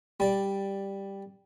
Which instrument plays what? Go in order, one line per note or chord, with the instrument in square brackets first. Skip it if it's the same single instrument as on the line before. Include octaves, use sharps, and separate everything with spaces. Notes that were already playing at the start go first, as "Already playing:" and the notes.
[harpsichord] G3 D5